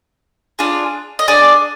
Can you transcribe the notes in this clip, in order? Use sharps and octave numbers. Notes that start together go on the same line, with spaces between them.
D4 F4 G#4
D#5
D4 G#4 D5